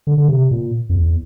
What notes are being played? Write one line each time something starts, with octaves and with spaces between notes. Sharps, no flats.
D3
D3
C3
A#2
F2
E2